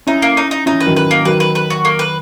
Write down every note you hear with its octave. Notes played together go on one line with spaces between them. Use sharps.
C#4 D#4 E4
A#3
D#4
D#4
C#4 D#4 E4
B4
D#3 F#3
B4
A#3
D#3 F#3 B4
B4
B4
F#4
A#3
B4